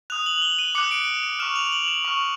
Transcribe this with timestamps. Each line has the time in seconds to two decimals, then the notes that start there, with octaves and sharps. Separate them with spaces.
0.10 D#6 F#6 F7
0.26 F#7
0.42 G7
0.59 D#7
0.75 D6 F#6 C#7
0.91 D7
1.23 D7
1.39 C#6 F6 E7
1.56 F7
1.72 F#7
1.88 E7
2.05 C#6 F6